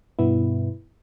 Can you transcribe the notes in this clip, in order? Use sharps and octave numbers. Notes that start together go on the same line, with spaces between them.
G2 B2 B3 E4